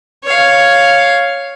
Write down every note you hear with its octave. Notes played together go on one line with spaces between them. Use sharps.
C#5 F5